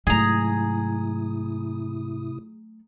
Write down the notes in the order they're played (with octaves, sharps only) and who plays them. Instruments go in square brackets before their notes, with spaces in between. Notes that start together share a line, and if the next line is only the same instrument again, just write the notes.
[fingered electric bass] G#2 [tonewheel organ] C3 E4 D#6 [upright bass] F#3 A3 [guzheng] G#4 A#5